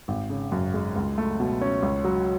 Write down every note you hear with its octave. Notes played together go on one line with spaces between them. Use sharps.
G#1
C#3
F#2
G#3
C#2
A3
B2
C#4
C#2
F#3